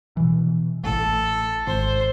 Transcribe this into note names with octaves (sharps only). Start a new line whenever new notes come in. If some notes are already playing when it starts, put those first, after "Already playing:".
B2 E3
A1 A2 A4
G#1 C5